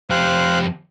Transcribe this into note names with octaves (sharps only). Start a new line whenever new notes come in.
F2 G4 C5 F5 F#6